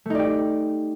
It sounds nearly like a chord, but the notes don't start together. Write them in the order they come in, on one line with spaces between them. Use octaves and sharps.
A3 D#4 D5 G4